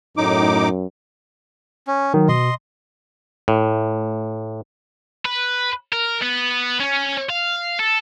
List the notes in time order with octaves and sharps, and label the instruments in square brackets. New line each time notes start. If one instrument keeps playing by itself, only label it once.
[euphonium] F#2 [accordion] A2 D#4 D6
[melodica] C#4
[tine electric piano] D#3 F#3
[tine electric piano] B2 [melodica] D#5 C6
[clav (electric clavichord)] A2
[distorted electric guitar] B4
A#4
B3
C#4
F5
A4